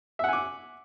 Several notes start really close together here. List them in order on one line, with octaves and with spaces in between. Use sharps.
E5 F#5 G#5 D6